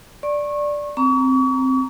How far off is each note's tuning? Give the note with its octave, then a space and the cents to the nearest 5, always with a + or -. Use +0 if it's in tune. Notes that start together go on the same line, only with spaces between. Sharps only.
D5 +0 C#6 -25
C4 +0 A#5 +0 C#6 +40